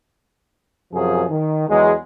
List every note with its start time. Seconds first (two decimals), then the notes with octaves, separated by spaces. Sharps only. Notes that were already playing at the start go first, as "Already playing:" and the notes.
0.94 F#2 C3 F3 G#4
1.29 D#3
1.68 E2 F#3 G#3